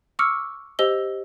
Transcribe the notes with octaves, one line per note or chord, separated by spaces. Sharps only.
C#6 D6 E6 F6 C#7
G4 C5 D#5 E6 G7